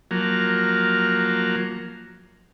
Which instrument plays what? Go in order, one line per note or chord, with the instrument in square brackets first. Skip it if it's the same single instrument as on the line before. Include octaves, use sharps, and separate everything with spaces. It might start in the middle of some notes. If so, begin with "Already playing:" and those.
[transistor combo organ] F3 F#3 A#3